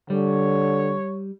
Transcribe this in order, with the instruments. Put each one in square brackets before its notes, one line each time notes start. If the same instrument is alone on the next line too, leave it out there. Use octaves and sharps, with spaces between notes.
[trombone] D3 [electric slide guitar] G3 [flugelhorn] C#5